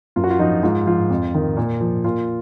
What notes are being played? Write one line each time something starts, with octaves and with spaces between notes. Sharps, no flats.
F#2 F4
F#4
F4
F3 D#4
G#2 F4
F3 F4
F2
D#3
A#2
F3
A#2 F4